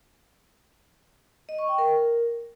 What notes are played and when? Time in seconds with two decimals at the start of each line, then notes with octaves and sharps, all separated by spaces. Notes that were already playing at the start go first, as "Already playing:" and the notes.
1.49 D#5
1.59 C#6
1.68 G5
1.78 A#4